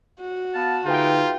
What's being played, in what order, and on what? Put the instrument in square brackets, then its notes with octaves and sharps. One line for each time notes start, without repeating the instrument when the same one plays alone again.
[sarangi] F#4
[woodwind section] B3 F5 A5
[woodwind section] D3 A3 D#4 [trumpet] F4 [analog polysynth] G#4 B4 G5